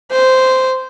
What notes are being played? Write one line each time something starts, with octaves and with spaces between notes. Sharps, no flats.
C5